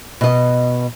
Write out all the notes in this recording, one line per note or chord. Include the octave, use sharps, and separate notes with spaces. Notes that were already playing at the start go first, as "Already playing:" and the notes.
B2 D#5